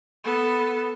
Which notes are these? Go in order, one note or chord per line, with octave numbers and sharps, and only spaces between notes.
B3 A4